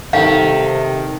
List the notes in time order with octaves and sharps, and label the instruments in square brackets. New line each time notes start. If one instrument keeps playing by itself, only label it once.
[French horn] C3 [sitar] D#3 [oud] A4 [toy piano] F5